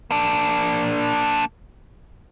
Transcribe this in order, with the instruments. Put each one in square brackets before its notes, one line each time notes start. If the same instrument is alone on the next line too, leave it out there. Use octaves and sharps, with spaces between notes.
[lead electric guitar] A#3 D4